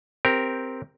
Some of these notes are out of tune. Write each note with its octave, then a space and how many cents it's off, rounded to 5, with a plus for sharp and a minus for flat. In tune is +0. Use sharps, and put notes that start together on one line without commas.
C4 +0 G4 +0 A#4 +0